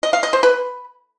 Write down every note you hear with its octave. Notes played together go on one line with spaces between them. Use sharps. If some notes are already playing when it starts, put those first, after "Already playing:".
D#5
F5
D#5
C5
B4